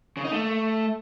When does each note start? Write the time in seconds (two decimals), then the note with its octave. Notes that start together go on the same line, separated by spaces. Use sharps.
0.17 C#3
0.24 D#4
0.32 A3